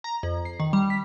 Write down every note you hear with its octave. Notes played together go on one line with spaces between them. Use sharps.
A#5
F2
C7
D#3
G3
B6